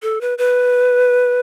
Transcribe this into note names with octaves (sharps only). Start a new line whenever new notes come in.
A4
B4
B4